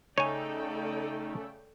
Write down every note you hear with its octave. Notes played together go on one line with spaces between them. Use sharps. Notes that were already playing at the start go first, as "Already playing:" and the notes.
C#3 A3 D#4 A4 C#5 D5 G5 G#5